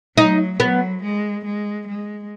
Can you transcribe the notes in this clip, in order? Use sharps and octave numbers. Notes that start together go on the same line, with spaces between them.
F#3 D#4
F#3 B3
G#3
G#3
G#3